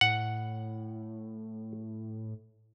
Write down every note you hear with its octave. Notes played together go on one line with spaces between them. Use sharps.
A2 F#5